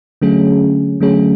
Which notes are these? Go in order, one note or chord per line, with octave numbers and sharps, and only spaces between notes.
D3 F#3 A3 C#4 G#4
D3 F#3 A3 C#4 G#4